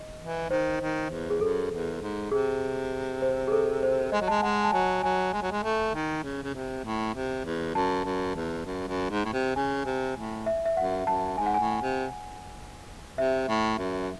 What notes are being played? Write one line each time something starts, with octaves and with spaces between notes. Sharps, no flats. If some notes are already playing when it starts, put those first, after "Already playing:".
Already playing: D#5
E3
D#3 C5
D#3
E2
G#4
F#2 A4
E2
G#2
C3 G#4
C5
G#4
A4
C5
G#3 D#5
F#3
G#3 A5
G#5
G#3 F#5
A5
F#3 G#5
F#3 G#5
G#3
F#3
G#3
A3
D#3
C#3
C#3
C3
A2
C3
E2
F#2 A5
F#2
E2
F#2
F#2
G#2
A2
C3
C#3 G#5
C3
A2
E5
E5
F#2 F#5
F#2 A5
G#2 G#5
F#5
G#5
A2
C3
C3 E5
A2
F#2